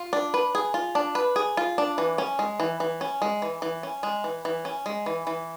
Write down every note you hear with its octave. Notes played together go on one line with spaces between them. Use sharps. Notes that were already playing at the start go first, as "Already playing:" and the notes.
Already playing: F4
D4
B4
G#4
F4
D4
B4
G#4
F4
D4
E3
C#4
G#3
E3
E3
C#4
G#3
E3
E3
C#4
G#3
E3
E3
C#4
G#3
E3
E3